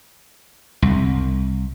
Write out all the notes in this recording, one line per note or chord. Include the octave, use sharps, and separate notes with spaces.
C2